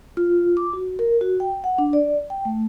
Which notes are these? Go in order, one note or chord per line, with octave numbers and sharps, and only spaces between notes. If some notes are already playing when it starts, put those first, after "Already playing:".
F4
D6
F#4
A#4
F#4
G5
F#5
D4
D5
G5
A3